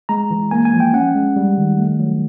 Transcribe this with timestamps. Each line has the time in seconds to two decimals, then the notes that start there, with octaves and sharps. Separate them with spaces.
0.09 G#3 A#5
0.31 E3
0.51 A#3 G#5
0.65 G#5
0.73 F3
0.80 G5
0.93 C#4 F#5
1.15 G#3
1.36 G3
1.58 D#3
1.79 A3
2.00 F#3